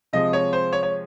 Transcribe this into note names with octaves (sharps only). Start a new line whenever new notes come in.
C3 F3 G#3 D#5
C#5
C5
C#5
C#5